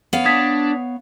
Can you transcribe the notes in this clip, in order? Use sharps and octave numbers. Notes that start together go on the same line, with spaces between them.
B3 C#5 F5
D4 D#6 G#6 B6